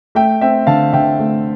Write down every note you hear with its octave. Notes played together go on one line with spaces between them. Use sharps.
A3 E5 G5
C4 E5 G5
D3 F5 A5
D3 E5 G5
A3